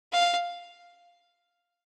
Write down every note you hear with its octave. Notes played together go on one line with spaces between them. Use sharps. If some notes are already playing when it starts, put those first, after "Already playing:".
F5